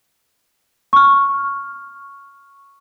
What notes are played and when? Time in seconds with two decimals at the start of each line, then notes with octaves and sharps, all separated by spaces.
0.93 C#6 F6